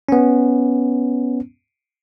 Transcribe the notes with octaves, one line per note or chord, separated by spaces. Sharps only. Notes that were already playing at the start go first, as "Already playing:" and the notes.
B3 C#4